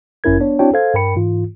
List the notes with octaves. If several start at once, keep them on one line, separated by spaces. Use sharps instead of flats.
G1 F#2 C#4 E4 A#4 G#6
B3 D4 C#5
C4 D4 E4 F#4 C#5 G5
A4 C5 F5 G#6
G2 A#4 G5 B5 C#7
G#2 E3 F4